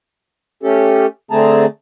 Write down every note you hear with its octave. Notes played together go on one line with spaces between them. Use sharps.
A3 C#4 G4 A4
D3 A3 C4 G#4 A5 A#5